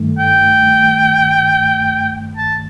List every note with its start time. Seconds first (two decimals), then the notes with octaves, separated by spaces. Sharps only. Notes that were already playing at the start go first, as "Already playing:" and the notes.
Already playing: G2 D#3 A3
0.19 G5
2.37 A5